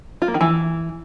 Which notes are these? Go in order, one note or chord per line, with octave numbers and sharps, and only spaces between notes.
F4
A#3
D#3
E3